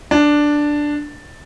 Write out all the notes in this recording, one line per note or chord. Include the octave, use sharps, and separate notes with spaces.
D4